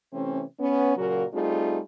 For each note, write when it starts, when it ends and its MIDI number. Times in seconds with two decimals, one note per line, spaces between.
0.14 0.43 48
0.14 0.43 52
0.14 0.43 57
0.14 0.43 60
0.14 0.43 61
0.60 0.94 59
0.60 0.94 61
0.97 1.25 46
0.97 1.25 49
0.97 1.25 54
0.97 1.25 58
0.97 1.25 66
0.97 1.25 70
1.34 1.80 55
1.34 1.80 57
1.34 1.80 60
1.34 1.80 63
1.34 1.80 65
1.34 1.80 68